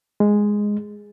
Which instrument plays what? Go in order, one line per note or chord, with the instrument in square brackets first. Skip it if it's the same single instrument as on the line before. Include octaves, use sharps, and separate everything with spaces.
[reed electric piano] G#3